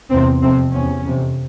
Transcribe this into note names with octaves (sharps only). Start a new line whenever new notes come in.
E2 C3 C4
F2 C3 C4
E2 C3 C#4
F2 C3